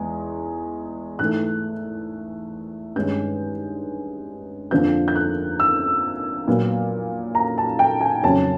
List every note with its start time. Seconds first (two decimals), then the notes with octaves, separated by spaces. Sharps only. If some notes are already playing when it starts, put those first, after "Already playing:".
Already playing: E2 G#3
1.19 G#2 E3 A3 F#6
2.96 G2 D#3 G#3 C#4 G6
4.71 F2 D3 F3 A#3 G6
5.08 G6
5.15 F#6
5.60 E6
6.47 A#2 F#3 B3
7.35 A#5
7.58 A5
7.79 G5
8.01 G#5
8.23 F2 C#3 F#3 A#3 C#4 A5